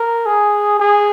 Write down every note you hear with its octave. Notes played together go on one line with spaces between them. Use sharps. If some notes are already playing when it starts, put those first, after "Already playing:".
Already playing: A#4
G#4
G#4